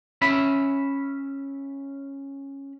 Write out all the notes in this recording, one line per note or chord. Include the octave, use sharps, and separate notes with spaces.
C#4 E5 B5